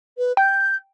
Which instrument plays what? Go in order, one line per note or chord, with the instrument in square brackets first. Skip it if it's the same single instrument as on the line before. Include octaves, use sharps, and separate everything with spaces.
[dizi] B4
[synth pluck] G5 [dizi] G6